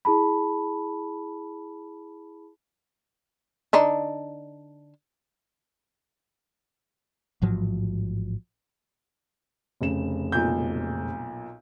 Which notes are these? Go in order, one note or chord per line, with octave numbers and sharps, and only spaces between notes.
E4 G#4 A5 B5
D3 D4 D#4
A1 G#2 F3 F#3
F1 C#3 E7
B1 A#2 G6